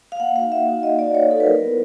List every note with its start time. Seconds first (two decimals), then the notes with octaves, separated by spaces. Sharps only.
0.12 F5
0.20 A#3 F#5
0.36 D#4 F#4 F5
0.51 A#3 E5
0.68 D#4 F#4
0.83 A#3 D#5
0.99 D#4 F#4 D5
1.15 A#3 C#5
1.30 D#4 F#4 A4
1.40 B4
1.46 F#3 A#4
1.62 B3 E4